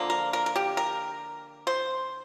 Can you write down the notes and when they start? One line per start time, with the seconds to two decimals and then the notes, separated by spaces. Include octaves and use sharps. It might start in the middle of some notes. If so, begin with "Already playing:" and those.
Already playing: D3 F3 A#3
0.10 A#4
0.33 A#4
0.46 A#4
0.56 G4
0.77 A#4
1.67 C5